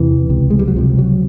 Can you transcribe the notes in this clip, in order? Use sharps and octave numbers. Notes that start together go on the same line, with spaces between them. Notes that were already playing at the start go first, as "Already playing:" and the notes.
Already playing: E2 C3 E3
C#2 C3
G#3
G3
F#3
C#2 C3 F3
F#3